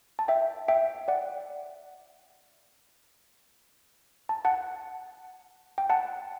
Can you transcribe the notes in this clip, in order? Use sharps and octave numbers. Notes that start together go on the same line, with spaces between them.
A5
E5 G5
E5 G5
D5 F#5
A5
F#5 A5
G5
F#5 A5